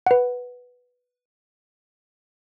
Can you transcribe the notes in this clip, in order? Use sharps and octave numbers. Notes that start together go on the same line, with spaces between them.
B4 F#5